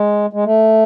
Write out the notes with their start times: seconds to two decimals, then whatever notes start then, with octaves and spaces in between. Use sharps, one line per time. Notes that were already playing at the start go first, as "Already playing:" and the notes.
Already playing: G#3
0.33 G#3
0.45 A3